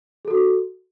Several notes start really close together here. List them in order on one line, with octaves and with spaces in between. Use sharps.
G#4 A4 F#4